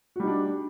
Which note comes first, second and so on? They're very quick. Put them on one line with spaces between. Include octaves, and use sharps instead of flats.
F#4 G3 D#4 D4